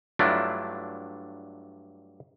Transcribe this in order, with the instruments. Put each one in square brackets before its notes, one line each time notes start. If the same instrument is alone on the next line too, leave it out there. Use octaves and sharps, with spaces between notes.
[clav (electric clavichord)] G2 F#3 A3 D4 E4 F4